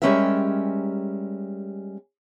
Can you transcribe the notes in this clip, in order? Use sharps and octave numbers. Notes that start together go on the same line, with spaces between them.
G3 G#3 C#4 G4 A#4 E5